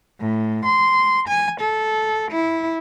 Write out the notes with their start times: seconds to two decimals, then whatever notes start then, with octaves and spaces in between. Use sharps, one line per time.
0.22 A2
0.65 C6
1.28 G#5
1.59 A4
2.31 E4